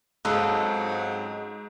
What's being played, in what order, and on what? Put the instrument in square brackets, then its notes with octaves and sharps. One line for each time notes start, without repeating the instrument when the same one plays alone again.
[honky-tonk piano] G#2 [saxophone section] F#3 C4 F#5 [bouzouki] G#3 C#4 F4 [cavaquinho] A4